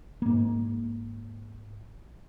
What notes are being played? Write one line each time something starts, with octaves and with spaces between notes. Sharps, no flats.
G#2 A#3